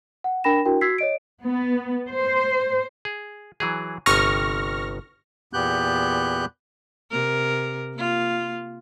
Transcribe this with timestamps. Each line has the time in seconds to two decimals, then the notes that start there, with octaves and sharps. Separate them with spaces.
0.24 F#5
0.44 D4 A#4 G5 B5 A#6 E7
0.65 D4 E4 F#4 A#4 G5
0.81 F#4 E6 G#6 B6 C7
0.98 C#5 D#5 D7
1.45 B3
2.10 C5
3.05 G#4
3.60 E3 F#3 G#4
4.06 G1 C3 G#5 C#6 F6 A#6
5.53 E2 A#2 B3 G4 F#6 G6
7.11 C3 A#4
7.94 A#3 F4